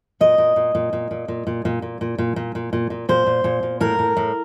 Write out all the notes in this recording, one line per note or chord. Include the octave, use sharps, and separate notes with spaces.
A#2 D#5
A#2
A#2
A#2
A#2
A#2
A#2
A#2
A#2
A#2
A#2
A#2
A#2
A#2
A#2
A#2
A#2 C5
A#2
A#2
A#2
A2 A#4
A2
A2